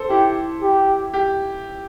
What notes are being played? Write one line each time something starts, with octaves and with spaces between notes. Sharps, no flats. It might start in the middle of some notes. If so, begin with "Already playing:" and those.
Already playing: A4 C5
E4 G4
G4
G4